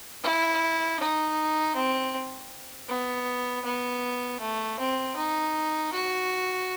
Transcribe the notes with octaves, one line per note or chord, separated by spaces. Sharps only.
E4
D#4
C4
B3
B3
A3
C4
D#4
F#4